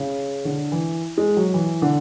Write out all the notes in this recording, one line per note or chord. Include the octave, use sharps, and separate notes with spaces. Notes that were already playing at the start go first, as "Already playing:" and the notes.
Already playing: C#3
D3
E3
G#3
F#3
E3
D3